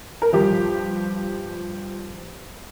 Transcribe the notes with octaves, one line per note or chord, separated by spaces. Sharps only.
A#4
G2 F3 G4